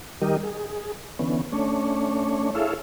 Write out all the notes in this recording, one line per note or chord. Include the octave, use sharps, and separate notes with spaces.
D#3 G3 G4 A#4 D#5
G#4
D3 E3 B3 C#4
A3 C#4 D4 C#5
E4 G#4 A4 C#5 E5 F5